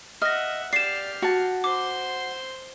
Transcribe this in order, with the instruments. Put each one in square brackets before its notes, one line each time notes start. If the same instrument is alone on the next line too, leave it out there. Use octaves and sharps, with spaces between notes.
[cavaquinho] D#5 [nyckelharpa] E5 F#5 [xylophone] F6 A#6
[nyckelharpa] G4 F5 [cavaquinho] D5 [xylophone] C7 E7
[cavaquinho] F#4 A5
[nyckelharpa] C5 C6 [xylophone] D6